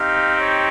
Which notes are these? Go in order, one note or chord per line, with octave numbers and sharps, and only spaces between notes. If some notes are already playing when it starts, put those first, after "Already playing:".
Already playing: C4 D#4 G4 F5
C#5